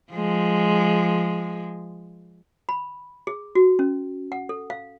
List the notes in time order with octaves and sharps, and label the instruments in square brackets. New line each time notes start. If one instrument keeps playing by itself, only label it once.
[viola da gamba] F3 G#3
[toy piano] B5
G#4
F#4
C#4
F#5
A4
F5